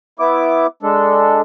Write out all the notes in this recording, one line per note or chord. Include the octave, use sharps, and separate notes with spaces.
B3 E4 D6
G#3 D4 A4